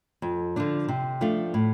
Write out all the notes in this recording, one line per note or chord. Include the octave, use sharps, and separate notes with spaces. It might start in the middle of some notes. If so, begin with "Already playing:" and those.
F2
D3 F3 D4
C3
F3 A3 D4 F4
A2